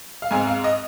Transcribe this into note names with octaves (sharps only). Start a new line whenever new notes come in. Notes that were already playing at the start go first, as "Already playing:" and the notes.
F5
G#2 G#3 C4 G#5
F5
D#5